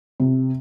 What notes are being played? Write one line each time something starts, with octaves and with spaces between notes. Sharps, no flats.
C3